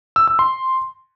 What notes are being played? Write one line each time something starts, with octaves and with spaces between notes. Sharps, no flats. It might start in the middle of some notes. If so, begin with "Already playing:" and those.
E6
E6
C6